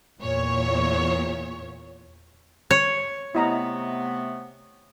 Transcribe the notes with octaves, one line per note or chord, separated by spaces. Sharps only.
E2 A#2 C#5
C#5
C3 A3 B3 E4 D#5 A#5